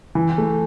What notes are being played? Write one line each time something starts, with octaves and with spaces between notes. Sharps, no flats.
E3
A3